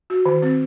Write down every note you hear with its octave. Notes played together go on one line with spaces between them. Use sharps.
F#4
D#3
C4